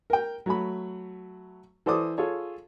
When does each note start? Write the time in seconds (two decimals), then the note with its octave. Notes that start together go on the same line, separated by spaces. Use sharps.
0.10 A#4 G5
0.46 F#3 A3 B5
1.86 E3 A4 C5 D5 D6 D#6
2.18 F4 G#4 A4 C#5